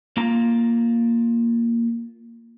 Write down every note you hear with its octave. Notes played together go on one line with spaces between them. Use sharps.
A#3 F4 A#5